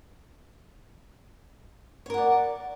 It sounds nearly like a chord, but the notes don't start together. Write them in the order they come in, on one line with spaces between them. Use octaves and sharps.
C#5 A#4 F#5 D5